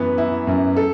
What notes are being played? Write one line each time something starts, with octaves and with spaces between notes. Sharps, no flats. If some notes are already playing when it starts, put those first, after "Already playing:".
Already playing: F#2 E3 B3
E4
F#2
A4